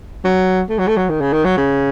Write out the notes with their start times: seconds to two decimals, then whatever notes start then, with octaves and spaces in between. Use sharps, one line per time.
0.24 F#3
0.70 A3
0.79 F#3
0.88 A3
0.97 F#3
1.09 D#3
1.21 C#3
1.33 D#3
1.45 F#3
1.57 C#3